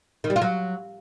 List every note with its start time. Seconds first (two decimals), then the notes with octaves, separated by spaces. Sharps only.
0.24 D#3
0.30 G3
0.36 F4
0.42 F#3